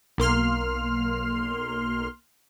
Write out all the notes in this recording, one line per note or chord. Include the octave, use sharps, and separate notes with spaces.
B1 A#3 C6 F6